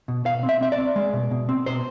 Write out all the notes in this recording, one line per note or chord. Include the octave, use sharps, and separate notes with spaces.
B2
B2 F5
C4
E5
C4 E5
D5
C4
G#3
B2
B2
C4
B2 C5